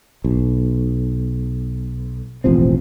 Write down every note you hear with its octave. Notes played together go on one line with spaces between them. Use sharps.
B1
E1 A1 F3 C4